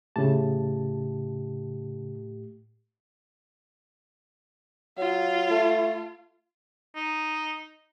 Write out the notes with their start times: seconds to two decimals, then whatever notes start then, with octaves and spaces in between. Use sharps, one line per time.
0.16 A2 C#3 A3 G4 A5
4.98 F#3 F4
5.50 A3
6.96 D#4